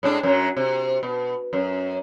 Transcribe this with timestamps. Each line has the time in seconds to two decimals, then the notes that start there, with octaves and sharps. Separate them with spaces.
0.03 A2 G#3 D4
0.23 F#2 F#3
0.57 C3
1.03 B2
1.53 F#2